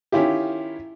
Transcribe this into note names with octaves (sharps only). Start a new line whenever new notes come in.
D#3 C#4 E4 F4 G4